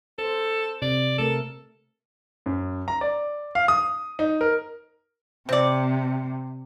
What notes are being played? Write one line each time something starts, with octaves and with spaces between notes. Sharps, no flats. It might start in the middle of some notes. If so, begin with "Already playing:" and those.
A4 C5
C3 D5
C3 A3 A4 A#4
F#2
A#5
D5
F5
D#6
D#4
A#4
C3 C4 D5